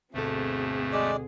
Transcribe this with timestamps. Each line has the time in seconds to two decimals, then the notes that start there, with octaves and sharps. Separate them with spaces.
0.14 D2 G2 B2 A3 C4 G#4 A4
0.93 G#3 D5